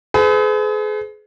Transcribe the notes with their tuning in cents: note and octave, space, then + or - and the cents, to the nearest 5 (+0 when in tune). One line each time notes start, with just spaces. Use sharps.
G#4 +35 B4 +45